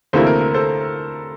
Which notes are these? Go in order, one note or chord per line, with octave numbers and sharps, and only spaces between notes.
D2 C3 E3 A#3 E4 A4 C5
A#4
A#4
A4 C5